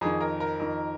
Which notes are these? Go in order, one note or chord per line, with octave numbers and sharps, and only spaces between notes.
F2 D#3 G#4
A#4
A#4
F2 D#3